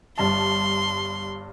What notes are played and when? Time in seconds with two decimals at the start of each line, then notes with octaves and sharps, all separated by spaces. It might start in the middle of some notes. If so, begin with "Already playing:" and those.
0.18 G1 G2 A5 C6